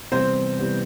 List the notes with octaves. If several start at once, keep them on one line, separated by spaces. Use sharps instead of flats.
C3 E3 G3 B3 C4 C5
C3 E3 G3 B3